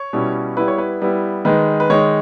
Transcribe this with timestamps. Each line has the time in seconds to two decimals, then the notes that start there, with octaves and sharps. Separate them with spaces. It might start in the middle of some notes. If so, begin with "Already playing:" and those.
Already playing: C#5
0.13 B2 G3 C#4 E4
0.57 G3 B3 E4 B4
0.68 C#5
0.78 B4
1.02 G3 B3 E4
1.45 D#3 G#3 D#4 B4
1.80 B4
1.90 D#3 G#3 D#4 C#5